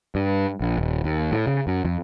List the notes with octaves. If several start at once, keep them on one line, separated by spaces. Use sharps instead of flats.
G2
A#1
D#1
D#2
A2
C#3
F#2
F2